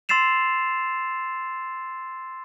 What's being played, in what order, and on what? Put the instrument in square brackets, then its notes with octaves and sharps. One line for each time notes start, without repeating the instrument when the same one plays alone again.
[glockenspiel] C6 E6 A6 C7 E7 F7